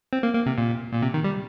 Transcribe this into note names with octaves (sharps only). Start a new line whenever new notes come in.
C4
A#3
A#3
C3
A#2
A#2
C3
D#3
G3